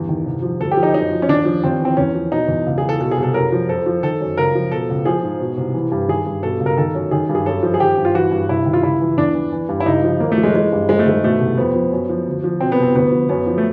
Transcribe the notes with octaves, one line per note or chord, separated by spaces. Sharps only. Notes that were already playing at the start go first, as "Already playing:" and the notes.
Already playing: E2 G2
D#3
C2
F3
D2 A4
G4
F3
D#4
F#2 D#4
F3
C#4
D#2 D4
F3
D#2 C4
E3 C4
E2 C#4
F3
B2 D#4
E2
C#2
G#4
E3
A4
B2 A4
G#4
C2
A4
F#2 A#4
F3
F2 A4
F3
D#3 A4
F#2
C#2 A#4
F3
B2 A4
C#2
F3 G#4
G#2
B2
C2
E3
G2
D#3 G#4
G2
B2 A4
C#2
A#4
D#3 A4
F#2
D#3 G#4
G2
G#4
F#2 A4
F3
G#4
D#3 G4
G2
F4
E3 F#4
G2
C2 E4
D#3
F4
C#2 E4
E3
E2 D4
E3
E3
G2
E4
C#2 D#4
F3
D#2 A#3
A3
F3
G#3
E3 G#3
G2
F2 G#3
A3
D#3 G#3
B2 A3
C2
F2 B3
F3
F#2
F3
D2
F3
B2 C4
B3
C2 C4
D2 B3
F3
F#2 B3
F3
A3